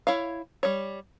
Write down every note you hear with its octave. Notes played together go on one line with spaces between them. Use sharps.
E4 C#5 F5
G3 C#5